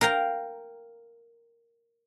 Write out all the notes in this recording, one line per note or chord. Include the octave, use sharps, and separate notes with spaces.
A#4 F5 G5 A#5